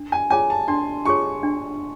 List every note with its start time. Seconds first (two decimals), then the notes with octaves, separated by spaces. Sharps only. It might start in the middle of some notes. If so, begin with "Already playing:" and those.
Already playing: D4
0.12 G#5
0.30 F4 G#4 C#5 G#5
0.50 A5
0.68 D4 C6
1.05 F4 G#4 C#5 C#6
1.43 D4